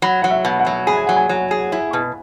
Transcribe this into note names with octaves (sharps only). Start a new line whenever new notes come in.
F#3 B5
F#3 F#5
E5
B2
F#5
F#3
G#4 B5
G#5
F#3 F#5
G#5
F#3
G#4
E4
B2